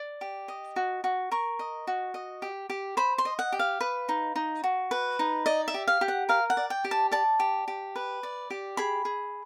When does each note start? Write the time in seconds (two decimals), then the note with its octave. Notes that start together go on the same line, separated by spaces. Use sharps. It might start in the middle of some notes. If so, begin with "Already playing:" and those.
Already playing: D5 D6
0.21 G4
0.48 D#5
0.76 F#4
1.04 F#4
1.31 A#4 C#6
1.59 D#5
1.87 F#4
2.14 D#5
2.42 G4
2.70 G4
2.97 C5 B5
3.18 C6
3.25 D#5
3.39 F#5
3.52 G4
3.59 F5
3.81 B4
4.09 D#4
4.36 D#4
4.64 F#4
4.91 B4
5.19 D#4
5.46 D5 D#5
5.68 E5
5.74 G4
5.88 F5
6.01 G4
6.08 F#5
6.29 A#4 F5
6.50 F#5
6.57 D5
6.70 G5
6.85 G4
6.91 A5
7.12 D5 A5
7.40 G4
7.68 G4
7.96 B4
8.23 D5
8.50 G4
8.77 G#4 B5
9.05 G#4